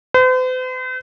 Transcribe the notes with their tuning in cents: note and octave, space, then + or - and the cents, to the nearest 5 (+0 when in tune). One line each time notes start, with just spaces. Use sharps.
C5 -45